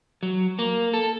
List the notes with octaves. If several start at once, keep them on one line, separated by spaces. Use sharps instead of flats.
F#3
A#3
A4